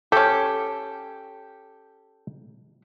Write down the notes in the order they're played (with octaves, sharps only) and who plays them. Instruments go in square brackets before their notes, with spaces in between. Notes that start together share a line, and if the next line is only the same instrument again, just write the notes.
[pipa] C#4 G4 [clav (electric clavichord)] A4